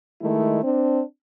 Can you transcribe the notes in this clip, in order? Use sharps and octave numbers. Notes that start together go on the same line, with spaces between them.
D#3 G#3 A3 E4
C4 D4